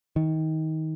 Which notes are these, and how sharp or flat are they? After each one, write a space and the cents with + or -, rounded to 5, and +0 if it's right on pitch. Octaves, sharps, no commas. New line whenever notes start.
D#3 +25